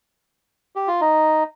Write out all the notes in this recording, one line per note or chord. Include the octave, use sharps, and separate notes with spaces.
G4
F4
D#4